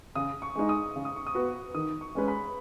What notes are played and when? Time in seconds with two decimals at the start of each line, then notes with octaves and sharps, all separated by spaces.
0.15 C#3 D#6
0.42 C#6
0.55 G#3 D#4
0.69 D#6
0.96 C#3
1.05 D#6
1.16 C#6
1.27 D#6
1.35 B3 F#4 B4
1.74 D#3 D#6
2.01 C#6
2.15 G#3 C#4 B4
2.28 B5